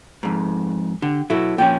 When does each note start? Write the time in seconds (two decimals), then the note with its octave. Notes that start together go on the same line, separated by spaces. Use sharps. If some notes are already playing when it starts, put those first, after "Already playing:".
0.23 F2 G#2
1.02 D3 G4
1.30 B2 F#3 E4 A4
1.58 A#2 F3 C#4 G5